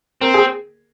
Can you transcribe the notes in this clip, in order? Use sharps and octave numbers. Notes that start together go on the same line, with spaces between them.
C4 A#4
G#4